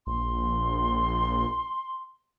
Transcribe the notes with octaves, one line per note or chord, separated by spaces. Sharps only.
A#1 C6